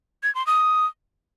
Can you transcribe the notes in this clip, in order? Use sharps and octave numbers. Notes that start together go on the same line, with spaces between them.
G#6
C6
D#6